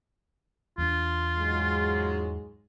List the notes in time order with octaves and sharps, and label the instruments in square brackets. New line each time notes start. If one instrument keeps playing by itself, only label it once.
[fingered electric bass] E2 B3 D4 [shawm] F4
[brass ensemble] G#2 F#3 G#3